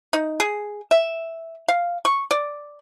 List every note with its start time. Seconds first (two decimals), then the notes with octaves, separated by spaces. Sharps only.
0.13 D#4
0.40 G#4
0.91 E5
1.68 F5
2.05 C#6
2.31 D5